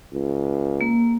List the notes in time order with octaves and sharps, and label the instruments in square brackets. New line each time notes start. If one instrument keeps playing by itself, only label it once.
[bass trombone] C#2
[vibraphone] A#3